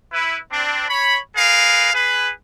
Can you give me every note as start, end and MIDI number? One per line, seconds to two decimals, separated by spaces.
0.12 0.37 64
0.12 0.37 71
0.51 0.86 60
0.51 0.86 62
0.88 1.18 73
0.88 1.18 83
1.35 1.91 68
1.35 1.91 70
1.35 1.91 71
1.35 1.91 77
1.93 2.30 68
1.93 2.30 71